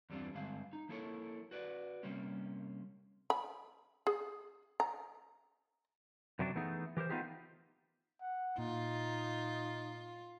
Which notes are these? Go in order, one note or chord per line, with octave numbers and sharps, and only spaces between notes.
E2 G2 G3 C4 D4 F4
G2 D3 G#3 C4 F5
D#4
F3 A#3 E4 A4 A#4 C#5
F#4 B4 D5
C3 G3 A#3 C4 C#4
B5
G#4
A#5
F#2 C3 F#3 D4
E3 A3 B3 D#4 G#4
E3 G4 A#4 C5
A3 B3 D#4 F4 G4 G#4
F#5
A#2 D#4 F4